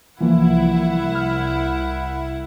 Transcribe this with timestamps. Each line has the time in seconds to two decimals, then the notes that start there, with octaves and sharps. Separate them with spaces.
0.21 C2 E3 F3 A#3 E4 F#5
1.15 F6